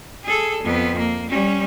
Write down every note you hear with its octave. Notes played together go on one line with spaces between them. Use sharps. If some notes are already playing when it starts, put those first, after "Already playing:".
G#4 A4
F2 B3
A#3
G3 C#4